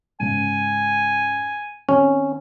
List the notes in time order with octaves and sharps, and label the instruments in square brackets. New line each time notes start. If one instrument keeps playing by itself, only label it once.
[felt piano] G#2 C#3 [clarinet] G#5
[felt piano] D#3 C4 [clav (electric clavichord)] C#4